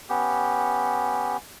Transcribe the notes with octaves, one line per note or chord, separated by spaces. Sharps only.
B3 C#4 G4